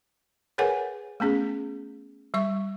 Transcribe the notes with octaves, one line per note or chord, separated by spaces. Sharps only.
G#4 A#4 B4 C#5 F#5 G#5
A3 B3 C#4 G#4
G3 E5 C#6